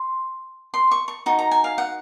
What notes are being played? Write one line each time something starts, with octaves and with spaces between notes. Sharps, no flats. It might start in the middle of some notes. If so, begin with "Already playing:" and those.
Already playing: C6
C6
C#6
C#6
D#4 F#4
A#5
G#5
F5
F#5